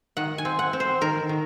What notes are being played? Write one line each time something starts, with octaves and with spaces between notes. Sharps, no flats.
D#3 F#5
G#5
C4
F#5
C4
C5
D#3 A#4
D#3